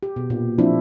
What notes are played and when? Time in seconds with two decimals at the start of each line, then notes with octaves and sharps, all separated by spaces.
0.03 G4
0.16 B2
0.30 A#2
0.59 F3 C4 D4 E4